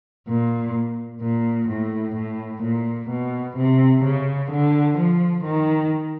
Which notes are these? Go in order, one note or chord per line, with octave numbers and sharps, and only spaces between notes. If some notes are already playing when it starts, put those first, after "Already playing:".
A#2
A#2
A2
A2
A#2
B2
C3
C#3
D3
F3
D#3